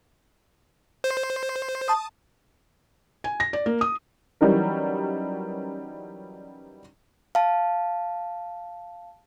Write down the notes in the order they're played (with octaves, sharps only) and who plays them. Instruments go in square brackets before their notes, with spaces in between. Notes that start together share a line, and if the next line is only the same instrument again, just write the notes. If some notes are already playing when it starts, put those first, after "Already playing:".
[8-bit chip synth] C5
[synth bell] A5 D#6
[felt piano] G#5
A#6
D5
A#3
D#6
[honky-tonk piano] E3 F#3 G3 C#4 D#4 A#4
[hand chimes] F5 A5